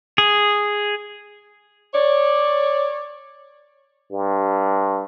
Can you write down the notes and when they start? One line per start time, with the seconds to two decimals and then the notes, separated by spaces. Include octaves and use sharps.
0.18 G#4
1.94 C#5 D5
4.13 G2